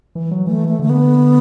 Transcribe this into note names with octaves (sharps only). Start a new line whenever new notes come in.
E3
F#3
E3 A3
A3
D3 A3
B3